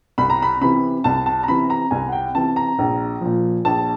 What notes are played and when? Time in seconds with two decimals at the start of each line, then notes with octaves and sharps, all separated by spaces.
0.18 C2 B5
0.30 A#5
0.42 B5
0.61 C3 E3 B5
1.04 C2 A5
1.26 A5
1.43 A#5
1.48 C3 E3 B5
1.70 A#5
1.91 C2 G#5
2.09 F#5
2.12 G5
2.35 C3 E3 A5
2.56 A#5
2.79 A#1
3.21 A#2 F3
3.65 A#1 A5